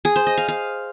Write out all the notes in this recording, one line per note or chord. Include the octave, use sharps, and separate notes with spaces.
G#4
C5
D#5
F5
F5